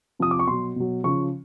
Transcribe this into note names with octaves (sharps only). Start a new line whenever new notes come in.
C3 F3 D#6
D6
C#6
B2 F#3 C6
B2 F#3
C#3 F3 C#6